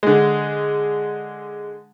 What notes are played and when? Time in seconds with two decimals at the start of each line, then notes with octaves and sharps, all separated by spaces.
0.03 D3 G#3